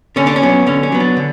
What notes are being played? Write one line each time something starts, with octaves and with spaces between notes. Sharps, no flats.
D3 C#4
D4
C#4
F#3 B3
D3 C#4
C#4
F#3 B3
D4
D3